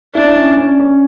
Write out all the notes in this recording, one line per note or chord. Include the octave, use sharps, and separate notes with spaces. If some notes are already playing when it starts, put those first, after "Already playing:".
D4 E4
C#4
C#4
C#4